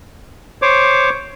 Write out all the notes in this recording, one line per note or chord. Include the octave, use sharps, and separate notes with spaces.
C5 C#5 D6